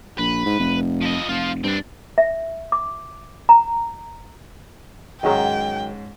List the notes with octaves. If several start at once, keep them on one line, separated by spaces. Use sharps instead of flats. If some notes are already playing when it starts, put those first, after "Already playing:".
A#1 B4
G#2
F1
F3 D#5
F1 F3 F4
G2 C4 D4
E5
D6
A#5
G#2 D#3 F#3 G#3 C#4 G5